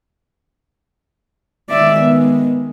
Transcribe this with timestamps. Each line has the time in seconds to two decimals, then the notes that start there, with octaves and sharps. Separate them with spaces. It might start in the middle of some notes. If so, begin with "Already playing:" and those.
1.69 D#3 G#3 D5 E5
2.01 B3